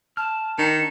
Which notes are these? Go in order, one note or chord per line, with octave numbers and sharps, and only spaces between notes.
A5 F6
D#3 D4 C#7